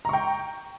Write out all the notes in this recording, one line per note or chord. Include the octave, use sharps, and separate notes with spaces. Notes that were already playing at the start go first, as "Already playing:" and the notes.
G5 A#5 C#6